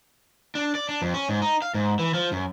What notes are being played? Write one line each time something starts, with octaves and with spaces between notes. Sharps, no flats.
D4
D5
D4
F2
C#4
G#2
D#4
F5
G#2
E3
F3
F#2